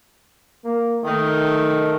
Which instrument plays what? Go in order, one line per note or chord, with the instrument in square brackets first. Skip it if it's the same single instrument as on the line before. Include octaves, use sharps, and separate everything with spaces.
[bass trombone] A#3
[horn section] D#3 [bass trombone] A3